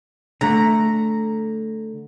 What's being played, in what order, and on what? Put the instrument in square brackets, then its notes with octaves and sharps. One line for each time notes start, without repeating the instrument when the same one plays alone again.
[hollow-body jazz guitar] D3 A3 [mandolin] A#5